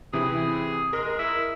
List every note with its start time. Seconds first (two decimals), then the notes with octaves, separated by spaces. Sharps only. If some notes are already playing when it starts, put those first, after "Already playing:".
0.13 C3 E3 E4 G#4
0.93 G#3 A#4
1.19 E4